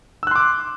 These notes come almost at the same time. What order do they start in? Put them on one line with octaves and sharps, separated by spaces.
E6 F#6 C6 D6